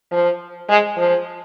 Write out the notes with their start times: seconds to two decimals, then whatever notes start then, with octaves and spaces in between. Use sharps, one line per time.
0.12 F3
0.69 G#3
0.97 F3